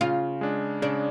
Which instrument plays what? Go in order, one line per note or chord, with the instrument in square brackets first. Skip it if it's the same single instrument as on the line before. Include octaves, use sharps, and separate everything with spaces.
[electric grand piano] C#3 [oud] F4
[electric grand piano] G#3 D4
[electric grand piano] C#3 [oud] D4